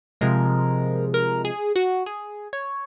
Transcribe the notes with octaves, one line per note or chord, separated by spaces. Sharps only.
C3 F3 G#3 A#4
A#4
G#4
F#4
G#4
C#5